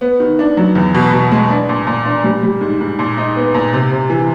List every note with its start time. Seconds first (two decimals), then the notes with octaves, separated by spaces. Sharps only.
0.01 B3
0.20 D#3
0.39 D4
0.57 F#3
0.75 E2
0.94 B2
1.12 B2
1.32 G#3
1.50 D4
1.69 A#2
1.87 A#2
2.05 D4
2.24 G3
2.43 G3
2.61 G#2
2.81 G#2
2.99 A#2
3.17 D#4
3.36 B3
3.54 A#2
3.73 C3
3.92 C3
4.10 E3